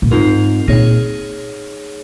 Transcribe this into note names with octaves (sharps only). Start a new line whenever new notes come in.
A#2
G#2 C4 F4 A#4
A#2 A#3 D#4 G#4 C#5